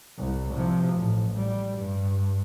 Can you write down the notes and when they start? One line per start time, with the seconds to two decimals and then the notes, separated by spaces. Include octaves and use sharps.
0.18 C2
0.55 C3 F3
0.94 A1
1.36 G3
1.78 G2